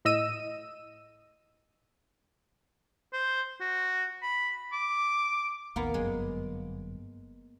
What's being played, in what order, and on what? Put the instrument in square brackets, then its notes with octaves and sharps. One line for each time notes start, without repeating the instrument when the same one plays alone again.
[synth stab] A2 D#5 E6 D#7
[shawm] C5
F#4
B5
D6
[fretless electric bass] A1 D#2 [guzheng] A#3 B3
[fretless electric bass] G1 F#2 [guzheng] G#3